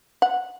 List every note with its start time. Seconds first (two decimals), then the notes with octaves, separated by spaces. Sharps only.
0.22 F#5